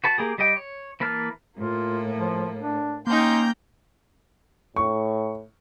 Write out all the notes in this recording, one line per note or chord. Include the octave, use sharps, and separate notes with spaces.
F#4 B4 A5
A#3 G4 G#4
G3 G4 D#5 G5
C#5
E3 A#3 B4 A5 F6
A2 A#3 F4
F3
D4
A#3 C#4 D#4 G5 A#5 C6 G6
A2 C#6